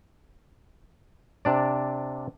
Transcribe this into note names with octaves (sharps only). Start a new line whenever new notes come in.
C3 D4 D5